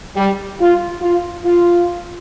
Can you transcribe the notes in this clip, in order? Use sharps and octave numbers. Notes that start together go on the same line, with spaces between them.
G3
F4
F4
F4